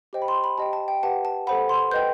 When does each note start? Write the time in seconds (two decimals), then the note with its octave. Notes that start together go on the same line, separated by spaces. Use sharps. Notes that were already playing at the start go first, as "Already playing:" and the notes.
0.13 G4 C5 D#5 G5
0.22 B5
0.28 C6
0.44 B5
0.58 G4 D#5 G5 A5
0.73 A5
0.88 G5
1.03 G4 B4 F#5 A5
1.25 A5
1.47 A4 C5 F#5 B5
1.69 C6
1.91 B4 D#5 G5 G6